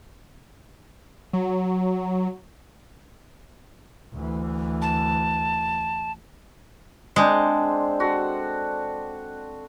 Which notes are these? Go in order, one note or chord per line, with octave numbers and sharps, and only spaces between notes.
F#3
D2 E3
A5
G#3 C4 D4 C5
F#4 A4